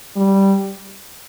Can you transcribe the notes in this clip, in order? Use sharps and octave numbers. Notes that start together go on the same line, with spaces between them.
G3